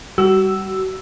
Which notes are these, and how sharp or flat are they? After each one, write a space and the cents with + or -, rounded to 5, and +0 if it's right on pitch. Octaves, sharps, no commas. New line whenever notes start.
G3 +0 F#4 +35 E6 +0